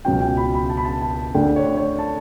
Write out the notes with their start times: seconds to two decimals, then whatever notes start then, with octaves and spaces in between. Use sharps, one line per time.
0.05 C#2 B2 F#3 C#4 G5
0.21 G5
0.37 B5
0.54 B5
0.69 A5
0.77 B5
0.84 A5
1.02 A5
1.34 D2 D3 A3 D4 G5
1.56 C#5
1.77 C#5
1.99 A5